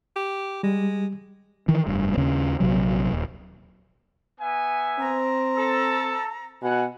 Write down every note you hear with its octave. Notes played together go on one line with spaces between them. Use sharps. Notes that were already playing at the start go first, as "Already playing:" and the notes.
G4
G3 G#3
D#3 E3
F1 G2
D#2 C#3 C#4
A#1 C3 F#3
D#1
B3 E5 G#5
C4 A#5
A4
B2 F#5 G#5